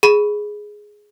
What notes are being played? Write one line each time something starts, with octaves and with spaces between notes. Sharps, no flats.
G#4 B5